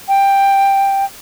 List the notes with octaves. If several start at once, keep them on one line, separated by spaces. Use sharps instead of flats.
G5